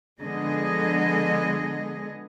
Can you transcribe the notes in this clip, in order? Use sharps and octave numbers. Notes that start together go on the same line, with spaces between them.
D3 F3 G#3 B3 G#4 D#5